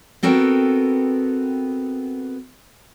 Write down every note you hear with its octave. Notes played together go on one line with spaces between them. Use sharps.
B3 C4 F#4 A4 A#4 G5